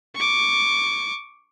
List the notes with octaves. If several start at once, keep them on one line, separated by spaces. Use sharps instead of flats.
C#6 D6